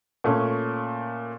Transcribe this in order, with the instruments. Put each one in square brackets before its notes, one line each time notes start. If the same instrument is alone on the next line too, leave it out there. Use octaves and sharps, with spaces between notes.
[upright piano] A#2 A3 C#4